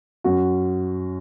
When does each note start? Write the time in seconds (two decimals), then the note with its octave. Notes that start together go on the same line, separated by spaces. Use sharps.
0.24 F#2 F#4